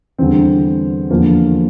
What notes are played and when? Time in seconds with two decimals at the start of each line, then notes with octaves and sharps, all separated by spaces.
0.18 E2 D3 G3 C4
1.11 E2 D3 F3 A#3